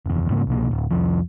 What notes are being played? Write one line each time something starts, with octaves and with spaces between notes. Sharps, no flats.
F#1 E2
G#2 C#3 A#3
C2 B2 A#3
D1
C2 F2 F3